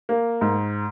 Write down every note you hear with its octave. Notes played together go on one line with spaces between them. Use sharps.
A#3
G#2